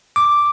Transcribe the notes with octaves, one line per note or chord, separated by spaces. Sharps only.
D6